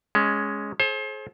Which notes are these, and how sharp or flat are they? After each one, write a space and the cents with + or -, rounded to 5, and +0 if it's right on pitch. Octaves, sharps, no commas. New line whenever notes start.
G#3 +0 C#4 +10
G#4 +45 C5 +35